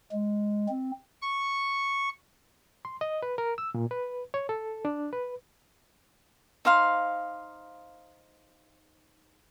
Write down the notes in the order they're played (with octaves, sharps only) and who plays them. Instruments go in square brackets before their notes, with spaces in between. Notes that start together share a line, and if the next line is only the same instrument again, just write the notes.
[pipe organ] G#3
C4
C#6
[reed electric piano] C6
D#5
B4
A#4
E6
A#2
B4
C#5
A4
D4
B4
[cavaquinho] D#4 C5 F5 C6